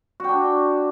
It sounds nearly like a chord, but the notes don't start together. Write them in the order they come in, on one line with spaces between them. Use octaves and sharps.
F#4 G5 D4